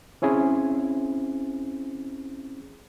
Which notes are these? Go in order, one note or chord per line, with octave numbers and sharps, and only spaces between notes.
C4 C#4 E4 G#4 C5